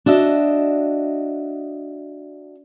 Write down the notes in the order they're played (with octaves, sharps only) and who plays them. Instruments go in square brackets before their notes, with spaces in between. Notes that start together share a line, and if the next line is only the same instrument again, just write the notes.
[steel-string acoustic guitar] D4 F#4 D#5 E5